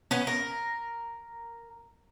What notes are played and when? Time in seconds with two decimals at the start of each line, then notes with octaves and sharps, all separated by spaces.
0.11 B3 C#4
0.27 A#4